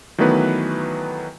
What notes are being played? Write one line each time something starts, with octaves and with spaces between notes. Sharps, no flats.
D#3 E3 F#3 A3 B3 B4